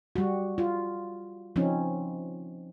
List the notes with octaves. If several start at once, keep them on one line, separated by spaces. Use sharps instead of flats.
G3 F#4
F4
F3 C4 C#4 D#4